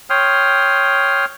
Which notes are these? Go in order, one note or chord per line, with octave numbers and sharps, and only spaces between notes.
C#5 G5 C6 D#6 F6